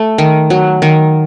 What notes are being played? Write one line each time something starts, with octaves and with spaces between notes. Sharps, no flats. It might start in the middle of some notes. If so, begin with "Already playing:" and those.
Already playing: A3
D#3
F#3
D#3